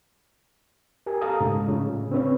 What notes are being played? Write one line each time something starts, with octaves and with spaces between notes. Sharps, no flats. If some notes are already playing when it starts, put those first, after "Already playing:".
G4 A#4 G#5
A4 F5 A5 A#5 D#6
G#2 C#3 G#3
A2 C#3 F4
C4 C#4 B4 C#5